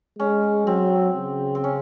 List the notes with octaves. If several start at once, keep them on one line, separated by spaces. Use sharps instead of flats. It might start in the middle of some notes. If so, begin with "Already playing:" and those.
G#3 C#4
F#3 C4
C#3
C4
C#4